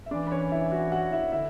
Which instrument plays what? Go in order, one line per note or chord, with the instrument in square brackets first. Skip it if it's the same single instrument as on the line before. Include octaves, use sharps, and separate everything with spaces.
[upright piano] E5
[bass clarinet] E3 [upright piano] D4 D5
[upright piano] B4
C#4 C#5
E4 E5
F#4 F#5
F#4 F#5
E4 E5
[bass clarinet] D3 [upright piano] E4 E5